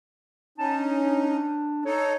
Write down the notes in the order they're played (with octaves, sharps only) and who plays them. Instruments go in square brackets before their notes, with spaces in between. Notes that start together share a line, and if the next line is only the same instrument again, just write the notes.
[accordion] C#4 D#4 [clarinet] A5
[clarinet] D4
[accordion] D#4 A4 [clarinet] C#5